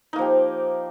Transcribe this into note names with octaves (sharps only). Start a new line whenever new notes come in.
F3 A#3 D#4 G4